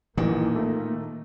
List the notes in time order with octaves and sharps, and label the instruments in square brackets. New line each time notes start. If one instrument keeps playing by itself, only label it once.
[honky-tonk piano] A1 E3 [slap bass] A#2 D#3 [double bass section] A#3
[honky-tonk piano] A3